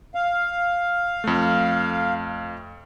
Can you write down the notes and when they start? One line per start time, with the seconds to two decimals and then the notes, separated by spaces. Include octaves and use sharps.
0.15 F5
1.24 F2 A3